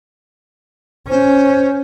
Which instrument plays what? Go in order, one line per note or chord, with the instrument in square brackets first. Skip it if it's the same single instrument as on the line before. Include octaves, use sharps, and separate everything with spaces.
[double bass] C#4 [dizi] C5